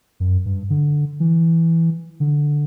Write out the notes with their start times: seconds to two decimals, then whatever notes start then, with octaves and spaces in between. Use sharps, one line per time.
0.20 F#2
0.46 G2
0.70 D3
1.20 E3
2.20 D3